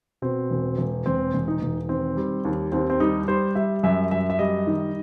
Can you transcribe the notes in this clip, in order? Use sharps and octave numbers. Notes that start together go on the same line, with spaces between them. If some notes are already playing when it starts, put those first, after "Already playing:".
B2 C4
E1
E1
E1 C4
E1
D#4
E1
D#3 C4
G3
D#2
D#2 C4
C4
G3 D#4
G3 C5
G3 E5
F#2 E5
F#2 E5
E5
G3 D#5
D#3